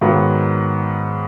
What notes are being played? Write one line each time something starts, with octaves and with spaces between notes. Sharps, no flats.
G#2 D#3 F#3 B3